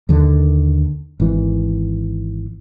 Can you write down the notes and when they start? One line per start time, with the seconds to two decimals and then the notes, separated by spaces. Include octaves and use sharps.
0.09 D#2 D3 D#3
1.20 G#1 E3